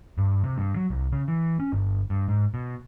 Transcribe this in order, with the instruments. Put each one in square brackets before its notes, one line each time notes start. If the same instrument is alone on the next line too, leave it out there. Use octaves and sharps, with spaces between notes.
[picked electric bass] G2
C3
G2
F#3
C2
C#3
E3
C#4
G1
G2
G#2
B2